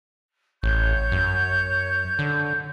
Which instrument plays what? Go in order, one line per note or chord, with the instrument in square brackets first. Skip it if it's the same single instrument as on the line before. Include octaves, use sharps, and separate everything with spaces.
[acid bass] A1 [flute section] C#5 C#6 G6
[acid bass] F#2
D3